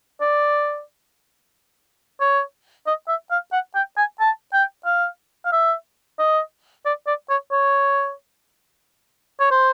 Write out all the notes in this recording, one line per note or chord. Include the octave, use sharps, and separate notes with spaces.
D5
C#5
D#5
E5
F5
F#5
G5
G#5
A5
G5
F5
F5
E5
D#5
D5
D5
C#5
C#5
C#5
C5